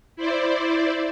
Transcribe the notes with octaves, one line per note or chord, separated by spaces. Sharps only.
E4 C5 D5